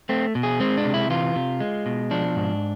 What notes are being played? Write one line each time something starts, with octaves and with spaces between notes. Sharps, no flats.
A3 C4
B2
G#4
G#3 C4
D4
C3
E4
E3 F4
C3
G#3
B2
F3 D4
G#2